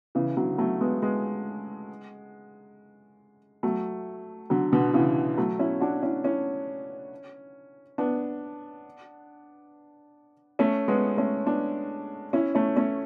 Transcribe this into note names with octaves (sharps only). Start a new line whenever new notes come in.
C#3 E3
D3 F#3
F#3 A3
G#3 B3
G#3 B3
F#3 A3
D3 F#3
B2 D3
C#3 E3
F#3 A3
C#4 E4
D4 F#4
C#4 E4
C#4 E4
B3 D4
A3 C#4
G#3 B3
A3 C#4
B3 D4
C#4 E4
A3 C#4
A3 C#4